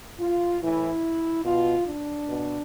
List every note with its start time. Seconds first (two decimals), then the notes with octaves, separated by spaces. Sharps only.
0.20 F4
0.61 A2 E3 E4
1.44 B2 F4
1.86 D4
2.27 B2